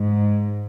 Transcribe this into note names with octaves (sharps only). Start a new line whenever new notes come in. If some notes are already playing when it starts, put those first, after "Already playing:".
Already playing: G#2